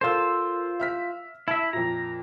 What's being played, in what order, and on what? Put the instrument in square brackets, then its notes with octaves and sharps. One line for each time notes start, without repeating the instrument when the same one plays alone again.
[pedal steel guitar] F4 C5 [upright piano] A4 A#4 E6
[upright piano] E5 F6 B6
[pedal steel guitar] E4 E5 [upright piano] A5
[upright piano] F2 A#2 [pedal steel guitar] A#5